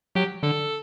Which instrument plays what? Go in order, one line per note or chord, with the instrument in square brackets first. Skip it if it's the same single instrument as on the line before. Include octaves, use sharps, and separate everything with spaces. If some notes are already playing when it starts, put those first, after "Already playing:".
[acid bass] F#3 [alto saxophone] G4
[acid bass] D3 [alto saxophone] A4